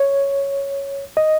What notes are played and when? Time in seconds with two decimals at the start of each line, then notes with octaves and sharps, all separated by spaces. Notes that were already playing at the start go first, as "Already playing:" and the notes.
Already playing: C#5
1.17 D#5